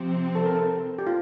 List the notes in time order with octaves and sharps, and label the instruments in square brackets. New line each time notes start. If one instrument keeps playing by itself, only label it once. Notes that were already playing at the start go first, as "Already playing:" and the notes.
Already playing: [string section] C3 F3 C4
[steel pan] A4
A#4
A4
G4
F4